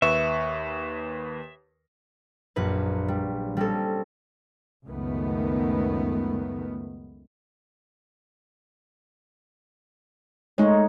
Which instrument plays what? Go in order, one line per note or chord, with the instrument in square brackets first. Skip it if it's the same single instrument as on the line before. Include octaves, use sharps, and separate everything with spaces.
[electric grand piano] D#2 B4 C#6 [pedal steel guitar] E5
[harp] A#1 F#2 D4 B4
G3
G3 C4 C#4 A4
[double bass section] C#2 F#2 D#3 A3 B3
[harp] G#3 [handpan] A3 D#4 C#5